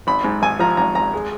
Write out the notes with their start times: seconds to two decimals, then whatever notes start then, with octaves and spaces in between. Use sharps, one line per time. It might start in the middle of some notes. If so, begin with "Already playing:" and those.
0.07 G#1 B5
0.24 G#2
0.42 G#1 G#5
0.59 F3 A#5
0.77 G#1 A#5
0.95 G#1 A#5
1.13 G#3